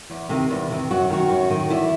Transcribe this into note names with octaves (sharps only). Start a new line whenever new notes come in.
E2
C3 D#3
E2
C3 D#3
F#2 F#4
D#3 F#4
F#2
D#3
E2 E4